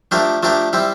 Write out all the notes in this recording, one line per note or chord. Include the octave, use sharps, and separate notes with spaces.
F3 A3 D4 G4 A#4
F3 A3 D4 G4 A#4
G3 C4 E4